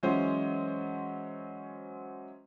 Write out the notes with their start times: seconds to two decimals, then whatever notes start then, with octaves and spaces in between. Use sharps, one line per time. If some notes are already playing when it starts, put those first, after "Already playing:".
0.03 E3 F#3 G#3 C#4 C5